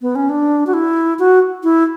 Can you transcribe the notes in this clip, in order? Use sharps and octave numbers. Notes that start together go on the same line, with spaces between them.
B3
C#4
D4
F#4
E4
F#4
E4